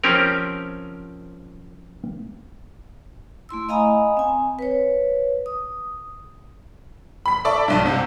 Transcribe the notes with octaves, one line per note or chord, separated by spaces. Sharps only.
F3 C4 C#4 G4 A#4
A3 E4 C6 E6
D#5 F5 G#5 A#5 B5 D#6
C4 G#5
B4 C#5
D#6
B5 B6
A4 D5 E5 C#6
B1 G2
C2 C3